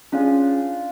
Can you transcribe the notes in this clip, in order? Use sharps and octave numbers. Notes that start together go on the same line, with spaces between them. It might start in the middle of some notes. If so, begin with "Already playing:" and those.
C#4 D4 F4 G#4